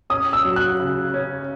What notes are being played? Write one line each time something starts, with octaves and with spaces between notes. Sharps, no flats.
C#4 D#6
E6
F#3
F#6
C#3
C#4